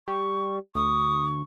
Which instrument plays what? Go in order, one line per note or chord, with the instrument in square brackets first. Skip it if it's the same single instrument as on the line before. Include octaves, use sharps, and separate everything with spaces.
[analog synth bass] G3 [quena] C#6
[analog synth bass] D2 [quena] C#6 [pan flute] D#6